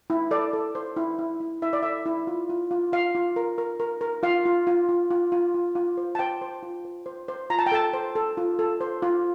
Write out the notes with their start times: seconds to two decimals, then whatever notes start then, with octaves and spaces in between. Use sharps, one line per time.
0.10 E4
0.31 A4 D5
0.53 A4
0.75 C5
0.96 E4
1.19 E4
1.40 E4
1.62 E4 E5
1.73 D5
1.83 A4 E5
2.06 E4
2.27 F4
2.49 F4
2.71 F4
2.92 F4 F5
3.15 F4
3.36 A#4
3.58 A#4
3.80 A#4
4.01 A#4
4.23 F4 F5
4.46 F4
4.67 F4
4.89 F4
5.11 F4
5.32 F4
5.54 F4
5.75 F4
5.97 C5
6.15 A5
6.19 C5 G5
6.42 C5
6.63 F4
6.85 C5
7.06 C5
7.29 C5
7.50 F4 A#5
7.59 A5
7.66 G5
7.72 A4 A5
7.94 C5
8.15 A4
8.37 F4
8.59 A4
8.81 C5
9.02 F4